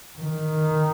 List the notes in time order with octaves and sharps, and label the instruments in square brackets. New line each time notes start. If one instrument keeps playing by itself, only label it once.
[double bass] D#3